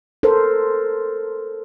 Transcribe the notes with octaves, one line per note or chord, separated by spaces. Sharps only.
A4 A#4 C5